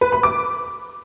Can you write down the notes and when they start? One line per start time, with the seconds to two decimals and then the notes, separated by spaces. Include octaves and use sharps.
0.01 B4
0.12 B5
0.23 D6